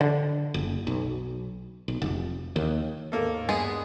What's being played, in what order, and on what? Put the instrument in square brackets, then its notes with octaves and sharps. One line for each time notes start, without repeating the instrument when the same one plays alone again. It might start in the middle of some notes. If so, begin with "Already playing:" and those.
[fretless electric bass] D3
F#1
B1
B1
F1
D#2
[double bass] D#2 G#2 [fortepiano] A#3 A4
[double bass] G2 [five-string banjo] G#3 B3 G#4